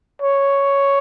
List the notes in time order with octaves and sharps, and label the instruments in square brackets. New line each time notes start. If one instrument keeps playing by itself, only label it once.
[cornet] C#5